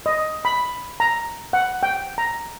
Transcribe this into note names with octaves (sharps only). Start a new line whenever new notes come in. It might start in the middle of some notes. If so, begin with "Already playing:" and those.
D#5
B5
A#5
F#5
G5
A#5